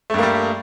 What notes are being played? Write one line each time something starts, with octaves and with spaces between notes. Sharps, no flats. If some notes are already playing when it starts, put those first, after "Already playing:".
G2 G3 A3 A#3